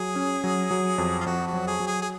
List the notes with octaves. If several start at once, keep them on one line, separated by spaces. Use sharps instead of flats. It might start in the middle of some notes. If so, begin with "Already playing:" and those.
Already playing: F#3 G#4
C#4
F#3
F#3
F2
F4
F2 F#4
F#4
F#3
G#4
F#3
G#4
G#4